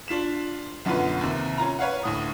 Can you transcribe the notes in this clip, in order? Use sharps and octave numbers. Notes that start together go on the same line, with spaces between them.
D4 F4 B6 E7
B1 F#2 D3 B3 F4 B4
D#2 C3
C#4 F4 A#5
B4 C#5 F5 F#5
D2 A2 D#6